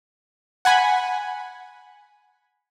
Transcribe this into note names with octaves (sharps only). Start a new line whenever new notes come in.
F#5 G#5 B5